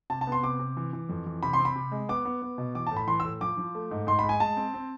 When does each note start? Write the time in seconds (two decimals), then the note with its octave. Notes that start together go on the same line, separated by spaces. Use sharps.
0.10 C3 A5
0.21 A5
0.27 B3
0.32 C6
0.43 C3 D6
0.59 C3
0.77 E3
0.93 E3
1.09 F2
1.26 E3
1.43 C3 B5
1.53 C6
1.59 C4
1.65 B5
1.76 C3
1.92 G#3
2.09 B3 D6
2.25 B3
2.42 B3
2.58 B2
2.75 E3 D6
2.87 A2 A5
2.97 B5
3.07 E3 C6
3.20 E6
3.25 A2
3.41 F3 D6
3.57 F3
3.75 A3
3.91 G#2
4.07 G#2 C6
4.19 G#3 B5
4.29 G#5
4.40 G#3 A5
4.57 C4
4.74 C4